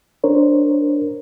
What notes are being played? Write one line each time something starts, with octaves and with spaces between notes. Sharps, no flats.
D4 A#4 C5 C#5